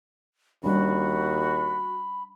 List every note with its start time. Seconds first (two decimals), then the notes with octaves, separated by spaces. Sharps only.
0.64 D#2 G3 C#4 D4 F#4 B5